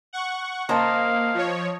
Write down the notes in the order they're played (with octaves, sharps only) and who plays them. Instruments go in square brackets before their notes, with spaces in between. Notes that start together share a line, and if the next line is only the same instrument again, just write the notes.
[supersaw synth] F#5 C#6
[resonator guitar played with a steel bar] C#3 C5 A#5 [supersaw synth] A#3 [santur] D#5 A5 [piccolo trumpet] F5
[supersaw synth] F3 C#5